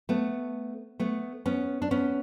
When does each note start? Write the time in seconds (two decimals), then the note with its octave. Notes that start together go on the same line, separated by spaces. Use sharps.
0.09 A3 B3
1.00 A3 B3
1.46 B3 C#4
1.82 D4
1.91 B3 C#4